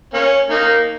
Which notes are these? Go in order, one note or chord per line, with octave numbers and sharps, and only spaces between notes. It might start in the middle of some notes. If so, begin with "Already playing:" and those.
A#3 C#4
A#3 D#4